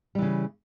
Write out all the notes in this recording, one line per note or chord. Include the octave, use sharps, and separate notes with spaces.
C#3 E3 G3